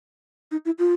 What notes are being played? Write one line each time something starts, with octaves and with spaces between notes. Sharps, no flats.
D#4
E4
F4